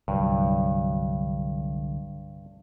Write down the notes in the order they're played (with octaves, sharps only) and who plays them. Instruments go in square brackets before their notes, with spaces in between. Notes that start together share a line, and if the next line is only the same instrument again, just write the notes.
[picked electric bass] C2 F#3 [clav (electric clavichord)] G2 [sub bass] D3